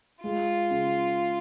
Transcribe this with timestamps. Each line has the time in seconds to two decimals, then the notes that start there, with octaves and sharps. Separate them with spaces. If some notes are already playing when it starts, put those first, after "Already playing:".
0.23 G#3 F4
0.70 C#3